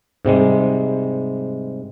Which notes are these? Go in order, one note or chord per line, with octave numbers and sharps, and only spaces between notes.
G#2 C3 G3 G#3